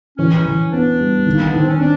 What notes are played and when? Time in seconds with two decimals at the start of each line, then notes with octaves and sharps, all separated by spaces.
0.18 E3 C#4
0.46 E3
0.72 B3 D4
0.99 G3
1.26 D#3
1.34 A#3
1.44 B3
1.54 D#3 C4
1.69 C#4
1.80 C4 D4